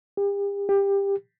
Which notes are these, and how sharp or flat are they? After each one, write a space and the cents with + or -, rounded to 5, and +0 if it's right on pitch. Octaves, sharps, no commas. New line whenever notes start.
G4 +40
G4 +20